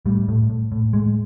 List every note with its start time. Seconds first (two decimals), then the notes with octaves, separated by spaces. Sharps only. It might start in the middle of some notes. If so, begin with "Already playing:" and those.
0.06 A2 G3
0.28 A2
0.50 A2
0.72 A2
0.93 A2 G#3